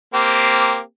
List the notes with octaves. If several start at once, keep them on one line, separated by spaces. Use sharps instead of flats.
A#3 C4 G4